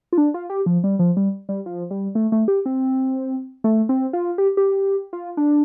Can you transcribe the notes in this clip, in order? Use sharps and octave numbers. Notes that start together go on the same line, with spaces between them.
F4
D4
F4
G4
F3
G3
F3
G3
G3
F3
G3
A3
A3
G4
C4
A3
C4
F4
G4
G4
F4
D4